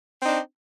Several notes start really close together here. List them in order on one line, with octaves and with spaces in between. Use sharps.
C4 D#4 D4